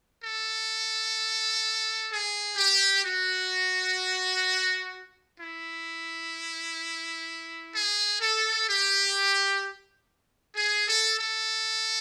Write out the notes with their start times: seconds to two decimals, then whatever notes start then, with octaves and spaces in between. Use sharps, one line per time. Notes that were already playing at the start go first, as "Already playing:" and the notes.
0.23 A4
2.11 G#4
2.58 G4
3.05 F#4
5.40 E4
7.75 G#4
8.21 A4
8.68 G4
10.56 G#4
10.88 A4
11.19 A4